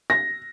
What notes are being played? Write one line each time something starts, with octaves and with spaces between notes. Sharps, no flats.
A#6